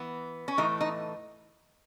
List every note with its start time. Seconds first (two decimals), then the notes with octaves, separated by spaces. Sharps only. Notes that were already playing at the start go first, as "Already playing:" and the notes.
Already playing: E3 B3
0.48 C#4
0.57 A2 E3 A3 D#4
0.81 D#4